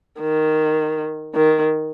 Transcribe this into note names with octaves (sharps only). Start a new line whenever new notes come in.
D#3
D#3